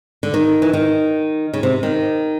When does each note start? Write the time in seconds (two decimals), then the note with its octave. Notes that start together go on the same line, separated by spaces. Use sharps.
0.23 D3
0.34 D#3
0.62 E3
0.73 D#3
1.54 C#3
1.63 C3
1.83 D#3